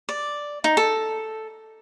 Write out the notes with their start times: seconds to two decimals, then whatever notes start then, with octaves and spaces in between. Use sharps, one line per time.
0.09 D5
0.64 D#4
0.77 A4